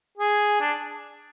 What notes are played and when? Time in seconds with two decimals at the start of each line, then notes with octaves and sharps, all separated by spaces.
0.18 G#4
0.60 D4